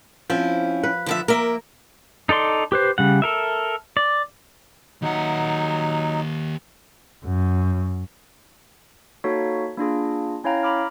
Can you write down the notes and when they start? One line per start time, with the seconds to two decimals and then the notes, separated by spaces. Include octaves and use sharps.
0.30 F3 C4 C#4 E4
0.83 B4
1.06 D3 F3 E5
1.28 A#3 A#4 E5
2.29 D#4 A4 D5 C6
2.72 G4 B4 C5
2.98 C#3 G3 F#5
3.22 A4 A#4 E5
3.97 D5
5.02 D#2 F#3 D#4 F#5
7.25 F#2
9.24 A#3 D#4 F#4 A4 C#5 B6
9.78 A#3 D4 F4 G#4
10.44 C#4 E4 C#5 F5 G5 A#5
10.63 A#5 B5 D6 F6